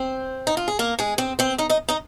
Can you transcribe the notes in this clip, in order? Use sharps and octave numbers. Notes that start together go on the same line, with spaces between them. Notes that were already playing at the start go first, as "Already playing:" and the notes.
Already playing: C4 C5
D#4
F4
G#4
A#3 A#4
G#3 G#4
C4 C5
C4 C5
D#4 D#5
D#4 D#5
D#4 D#5